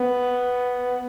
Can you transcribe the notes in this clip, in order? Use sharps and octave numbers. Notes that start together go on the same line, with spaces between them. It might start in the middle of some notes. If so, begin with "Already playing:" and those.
Already playing: B3